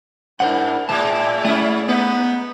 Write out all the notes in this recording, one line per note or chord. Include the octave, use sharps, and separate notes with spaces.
G2 D4 E4 A#4 C5 F#5
A2 G#3 D5 E5 A5
A3 A#3 C#4 E4
B3 D#4 B4